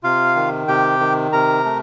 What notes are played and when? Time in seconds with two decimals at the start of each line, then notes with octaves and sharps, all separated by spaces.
0.03 C3 F4 F5
0.36 D#3
0.68 C3 G4 G5
1.00 D#3
1.32 C3 A#4 A#5
1.65 A3